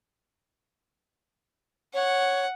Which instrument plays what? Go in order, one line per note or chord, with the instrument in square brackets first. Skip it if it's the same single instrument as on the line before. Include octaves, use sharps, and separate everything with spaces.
[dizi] C#5 [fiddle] F#5